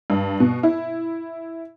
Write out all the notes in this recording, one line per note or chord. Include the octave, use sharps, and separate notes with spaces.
G2
B2
E4